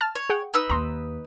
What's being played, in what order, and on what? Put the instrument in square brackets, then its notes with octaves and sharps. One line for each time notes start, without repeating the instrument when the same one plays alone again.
[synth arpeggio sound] A5 F6 A6
[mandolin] C#5
[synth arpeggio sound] G#4 F#5 G5
[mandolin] D#4 B4 E6
[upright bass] D#2 [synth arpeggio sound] A#5 C6